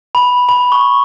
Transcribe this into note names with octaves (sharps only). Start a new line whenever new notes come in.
B5
B5
C#6